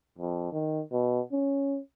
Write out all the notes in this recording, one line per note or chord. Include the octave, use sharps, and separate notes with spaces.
F2
D#3
B2
C#4